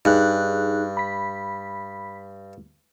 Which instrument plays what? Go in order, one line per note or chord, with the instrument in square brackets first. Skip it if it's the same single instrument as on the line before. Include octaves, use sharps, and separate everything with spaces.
[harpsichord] G2 [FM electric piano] D#4 G#4 F#6
[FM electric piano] B5 B6